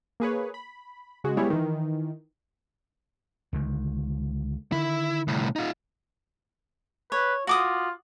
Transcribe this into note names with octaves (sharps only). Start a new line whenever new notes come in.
A#3 G#4 B4 C#5
B5
C#3 G#3 F#4
G3 G#3 B3 E4 G#4 C#5
D#3 E3
C#2 D3 D#3
D3 D#3 E4
C2 A2
D#4 F4
B4 C#5
F4 F#4 D6 D#6